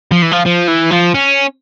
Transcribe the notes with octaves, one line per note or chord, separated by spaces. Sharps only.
F3
E3
F3
F3
E3
F3
C#4